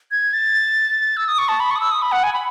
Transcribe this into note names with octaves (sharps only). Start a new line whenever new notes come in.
G#6
A6
E6
D#6
C#6
A5
B5
C#6
D#6
E6
D#6
B5
F#5
G#5
B5